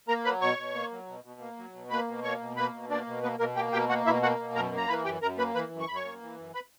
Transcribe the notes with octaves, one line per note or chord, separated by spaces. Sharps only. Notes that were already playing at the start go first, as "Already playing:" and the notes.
A#3 A#4 A#5
F#3 B4 B5
B2 C#5 C#6
B2
A#3
F#3
B2
B2
A#3
F#3
B2
A#3 B4 B5
B2
A#3 C#5 C#6
B2
A#3 B4 B5
B2
A#3 D4 D5
B2
A#3 B3 B4
B2 A#3 A#4
A#3 G4 G5
B2 G4 G5
A#3 F#4 F#5
B2 E4 E5
A#3 F#4 F#5
B2
F#2 A#4 A#5
A#3
A#5
E3 B4 B5
F#2 G4 G5
F#2 A#4 A#5
A#3 B4 B5
E3 B4 B5
F#2
C#6
F#2 B5
C#5 C#6
A#3
E3
F#2
B4 B5